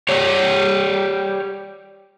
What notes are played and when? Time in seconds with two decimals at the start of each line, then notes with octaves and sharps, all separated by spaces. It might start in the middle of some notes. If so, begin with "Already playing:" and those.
0.09 G4 C#5 D5